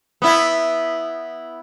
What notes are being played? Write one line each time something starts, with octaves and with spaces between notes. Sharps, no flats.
B3 E4